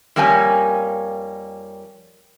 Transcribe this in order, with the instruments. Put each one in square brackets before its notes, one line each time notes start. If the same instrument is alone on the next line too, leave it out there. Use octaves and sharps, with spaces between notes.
[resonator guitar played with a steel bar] F2 G3 A#3 C#4 G#5